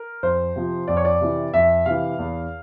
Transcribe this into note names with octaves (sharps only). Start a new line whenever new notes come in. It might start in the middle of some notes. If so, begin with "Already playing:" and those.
Already playing: A#4
F2 C5
C3 F3
F2 D5
C#5
D5
C3 E3
F2 E5
C3 E3 F5
E2